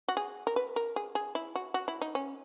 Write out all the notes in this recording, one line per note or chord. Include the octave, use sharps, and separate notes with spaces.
F#4
G#4
A#4
B4
A#4
G#4
G#4
E4
F#4
F#4
E4
D#4
C#4